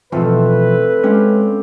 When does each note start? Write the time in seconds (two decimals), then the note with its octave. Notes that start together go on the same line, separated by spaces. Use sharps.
0.12 B2 E3 F3 A3 C4 A4 B4
1.03 G#3 C#4 G4 F5